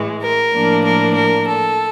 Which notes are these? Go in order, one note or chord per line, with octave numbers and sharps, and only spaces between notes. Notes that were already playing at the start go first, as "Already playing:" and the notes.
Already playing: A2 E3 G#3
A#4
A2 F3 A#3 D4
A#4
A#4
A4